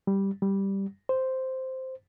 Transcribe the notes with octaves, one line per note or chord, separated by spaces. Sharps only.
G3
G3
C5